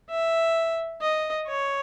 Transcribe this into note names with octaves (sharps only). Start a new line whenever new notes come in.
E5
D#5
C#5